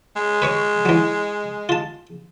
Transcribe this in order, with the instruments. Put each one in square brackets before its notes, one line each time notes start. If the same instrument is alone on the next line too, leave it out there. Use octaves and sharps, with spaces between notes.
[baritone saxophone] G#3
[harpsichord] B4 C#5 C#6
E3 F#3
F4 A5